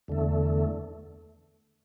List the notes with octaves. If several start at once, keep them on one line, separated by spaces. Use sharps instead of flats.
E2 D3 A3